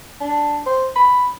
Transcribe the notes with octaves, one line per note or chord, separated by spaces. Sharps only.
D4
C5
B5